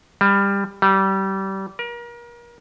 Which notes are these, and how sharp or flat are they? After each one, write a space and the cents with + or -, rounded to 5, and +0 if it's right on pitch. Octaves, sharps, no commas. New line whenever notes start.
G3 +20
G3 -25
A#4 +35